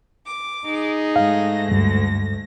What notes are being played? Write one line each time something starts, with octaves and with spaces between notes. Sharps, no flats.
D6
D#4 G#4
G#2 A3 F5 A#6
D2 G2